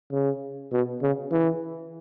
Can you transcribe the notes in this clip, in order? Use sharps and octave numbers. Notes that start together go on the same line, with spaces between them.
C#3
B2
C#3
E3